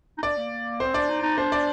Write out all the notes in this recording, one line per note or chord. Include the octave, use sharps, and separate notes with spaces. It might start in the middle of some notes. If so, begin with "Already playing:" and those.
D#4
D4 D5
A#3
C4 C5
D4 D5
D#4
D#4
D4 C5
D5